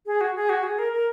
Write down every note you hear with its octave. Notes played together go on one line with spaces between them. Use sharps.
G#4
F#4
G#4
F#4
G#4
A#4
A#4